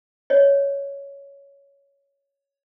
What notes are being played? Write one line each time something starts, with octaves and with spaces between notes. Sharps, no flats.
C#5 D#5